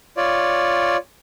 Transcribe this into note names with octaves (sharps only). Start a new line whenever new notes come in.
F4 C#5 D5